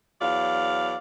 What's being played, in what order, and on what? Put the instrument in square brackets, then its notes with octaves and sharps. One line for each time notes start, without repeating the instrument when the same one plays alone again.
[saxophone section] E2 F#3 D5 F5